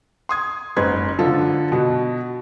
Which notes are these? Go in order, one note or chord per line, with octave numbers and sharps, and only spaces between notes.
C6 D#6 G#6
F#1 G#2 B4 G#6
D3 F3 F4 A4
B2 F#4